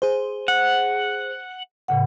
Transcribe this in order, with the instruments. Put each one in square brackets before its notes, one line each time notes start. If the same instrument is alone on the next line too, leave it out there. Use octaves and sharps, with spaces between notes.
[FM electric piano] G#4 C5
[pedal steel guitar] F#5
[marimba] A2 C#3 F#5